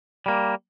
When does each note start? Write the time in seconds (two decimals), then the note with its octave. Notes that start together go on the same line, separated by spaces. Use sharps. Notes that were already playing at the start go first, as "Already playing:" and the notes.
0.26 G3 A#3